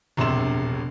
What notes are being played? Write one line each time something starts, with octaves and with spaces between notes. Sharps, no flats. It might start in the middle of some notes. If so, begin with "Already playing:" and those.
E1 A#1 C3 C6 E7